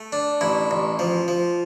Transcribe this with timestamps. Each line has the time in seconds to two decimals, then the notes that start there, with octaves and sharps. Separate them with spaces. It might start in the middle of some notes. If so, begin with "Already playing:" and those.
Already playing: A3
0.12 D4
0.41 A1 E4
0.71 A1
0.99 F3
1.28 F3